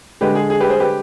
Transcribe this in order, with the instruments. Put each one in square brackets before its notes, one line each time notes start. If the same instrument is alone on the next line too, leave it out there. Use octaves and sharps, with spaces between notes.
[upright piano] D3 G#3 D4 G4 B4
G#4
G#4
G4 B4
G#4 C5
G4 B4